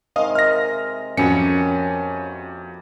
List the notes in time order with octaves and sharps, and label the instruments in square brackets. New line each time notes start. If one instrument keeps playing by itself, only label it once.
[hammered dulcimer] C3 D#3 G#3 [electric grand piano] D#5 F5 D#6
[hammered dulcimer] E5 [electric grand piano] F6 A#6
[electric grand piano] F2 F#4 C#7 [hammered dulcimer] A#3 G4 [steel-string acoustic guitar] C#4